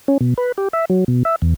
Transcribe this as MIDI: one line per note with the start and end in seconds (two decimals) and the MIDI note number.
0.08 0.18 61
0.21 0.34 47
0.38 0.52 71
0.58 0.68 67
0.73 0.85 76
0.90 1.04 54
1.08 1.23 47
1.25 1.36 76
1.42 1.54 40